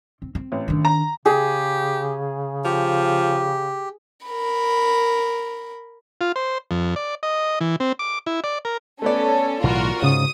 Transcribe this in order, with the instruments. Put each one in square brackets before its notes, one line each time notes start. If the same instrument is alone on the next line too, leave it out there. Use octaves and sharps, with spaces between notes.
[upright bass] C4
C4
[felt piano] A1
[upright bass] D#3 D4
[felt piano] A#5
[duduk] C#3 [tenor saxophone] G4 [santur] G#4
[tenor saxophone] F3 [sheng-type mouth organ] G4
[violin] A#4 B5
[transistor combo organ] F4
C5
F2
D5
D#5
E3
C4
D6
E4
D5
A#4
[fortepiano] A3 B3 D5 [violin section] C#4 A4
[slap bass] B1 A2 E3 [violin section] F4 F#4 A#4
[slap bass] G#2 [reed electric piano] C#3 [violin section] D#6